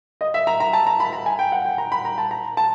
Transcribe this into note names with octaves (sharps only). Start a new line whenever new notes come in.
D#5
E5
A#5
A#5
A5
A#5
B5
A#5
G#5
G5
F#5
G5
A#5
B5
A#5
A5
A#5
A5